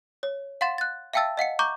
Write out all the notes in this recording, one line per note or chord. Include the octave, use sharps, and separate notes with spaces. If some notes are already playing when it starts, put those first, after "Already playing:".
C#5
F5 F#5 C6 A6 E7
F#6 A6
E5 F5 G5 A5 E6 A6
D#5 F5 F#5 C#7
A#5 C#6 D6 G6